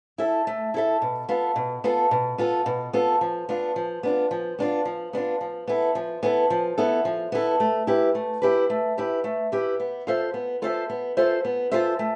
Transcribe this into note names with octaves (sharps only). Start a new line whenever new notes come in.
E4 A4 E5
A3
E4 A4 E5
B2
B3 F4 A4
B2
B3 F4 A4
B2
B3 F4 A4
B2
B3 F4 A4
F3
B3 D4 F4
F3
B3 D4 F4
F3
B3 D4 F4
F3
B3 D4 F4
F3
B3 E4 A4
F3
B3 E4 A4
F3
B3 E4 A4
F3
B3 E4 A4
A3
E4 G4 B4
A3
E4 G4 B4
A3
E4 G4 B4
A3
E4 G4 B4
B3
F4 A4 C5 E5
B3
F4 A4 C5 E5
B3
F4 A4 C5 E5
B3
F4 A4 C5 E5
A3